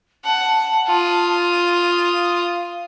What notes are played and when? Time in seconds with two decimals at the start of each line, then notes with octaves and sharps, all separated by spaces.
0.25 F#5 A5
0.88 F4 D#6
1.79 F5